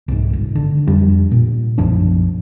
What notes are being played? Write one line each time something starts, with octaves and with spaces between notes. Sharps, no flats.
C2 G#2
G1
D3
F2 G3 D4
A#2
B1 F#2 F3 D4